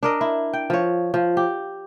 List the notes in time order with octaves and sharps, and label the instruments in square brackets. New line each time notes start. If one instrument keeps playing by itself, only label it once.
[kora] D4 A#4 D#5
E4
G5
F3 C#5
F3
G4